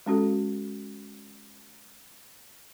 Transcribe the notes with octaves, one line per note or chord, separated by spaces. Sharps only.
G#3 C#4 F#4 A4